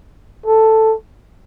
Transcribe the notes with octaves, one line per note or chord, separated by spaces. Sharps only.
A4